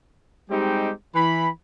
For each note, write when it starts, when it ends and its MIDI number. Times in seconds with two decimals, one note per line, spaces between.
0.50 0.91 55
0.50 0.91 56
0.50 0.91 60
0.50 0.91 63
0.50 0.91 67
1.14 1.48 52
1.14 1.48 83